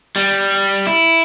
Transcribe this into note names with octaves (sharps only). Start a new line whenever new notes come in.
G3
E4